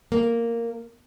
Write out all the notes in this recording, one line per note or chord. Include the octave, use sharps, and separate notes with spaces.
A#3